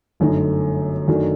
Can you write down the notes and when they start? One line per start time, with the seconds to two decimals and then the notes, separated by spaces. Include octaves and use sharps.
0.20 G1 F#2 D3 A3 D#4
1.08 F#2 D#3 F#3 A3 D4